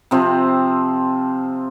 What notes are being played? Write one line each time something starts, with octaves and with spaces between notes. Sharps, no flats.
C3 F3 C4